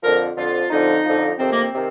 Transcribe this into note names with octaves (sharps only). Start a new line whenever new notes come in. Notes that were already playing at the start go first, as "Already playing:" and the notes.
F2 D3 F3 A#4
F2 D3 F3 F4
F2 D3 F3 D#4
F2 D3 F3
F2 C3 D#3 C4
A#3
C4
C3 D#3